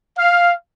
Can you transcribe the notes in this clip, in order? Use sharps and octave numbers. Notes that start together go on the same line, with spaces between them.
F5